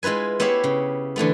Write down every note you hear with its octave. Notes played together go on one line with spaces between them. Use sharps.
G#3 E4 F4 B4 G#5
B3 E4 G4 C#5 E5 F5
C#3
D3 E3 A3 B3